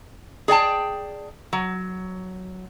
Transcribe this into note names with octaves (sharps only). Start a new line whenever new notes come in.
G#4 D5 G5 A5
F#3